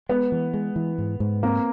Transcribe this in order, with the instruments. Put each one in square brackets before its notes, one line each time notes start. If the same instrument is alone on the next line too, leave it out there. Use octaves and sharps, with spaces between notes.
[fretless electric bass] G#3 [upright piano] B3
[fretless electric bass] E3
G#3
E3
G#2
G#2
[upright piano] A#3 [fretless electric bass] C4